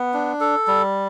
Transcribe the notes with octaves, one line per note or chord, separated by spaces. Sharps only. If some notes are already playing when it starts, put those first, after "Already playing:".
Already playing: B3
D4
A4
G3